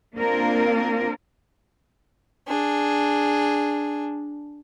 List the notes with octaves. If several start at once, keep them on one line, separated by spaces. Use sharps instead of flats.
A#3 C4 D4 F4 A#4
D4 G#4